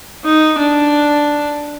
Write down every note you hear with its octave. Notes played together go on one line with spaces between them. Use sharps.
D#4
D4